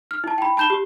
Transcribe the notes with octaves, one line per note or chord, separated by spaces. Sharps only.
F6
E4 A5
G5 B5
A5 B5 G6 E7 G7
G4